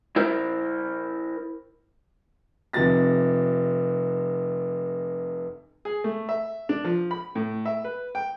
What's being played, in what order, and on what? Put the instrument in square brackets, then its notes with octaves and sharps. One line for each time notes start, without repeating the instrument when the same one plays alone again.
[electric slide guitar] E4 A#4 C5
[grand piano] F1 C3 F3 A6 A#6
[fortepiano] G#4
A3
E5
D4
F3
B5
A2
E5
B4
G5